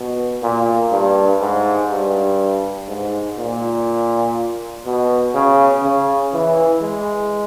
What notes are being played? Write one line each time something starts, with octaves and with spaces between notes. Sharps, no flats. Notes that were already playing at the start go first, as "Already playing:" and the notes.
Already playing: B2
A#2
G2
G#2
G2
G#2
A#2
B2
C#3
C#3
E3
G#3